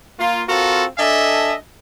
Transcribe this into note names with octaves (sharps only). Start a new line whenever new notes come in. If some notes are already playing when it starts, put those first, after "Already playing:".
A#3 F4
C4 F4 F#4 A4 A#4
D4 A4 D#5 E5 G#5